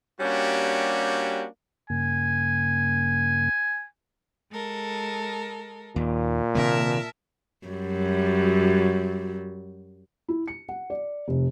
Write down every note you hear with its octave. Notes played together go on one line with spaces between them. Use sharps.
G3 A#3 C#4 D4 F#4 G4
G2 C#3 A#3 G#5
G#3 A4 A#4
D#2 A#2
C3 D#3 A#3 A#4 E5 A5
F#2 F#3 G3
E4
C#7
F#5
D5
F1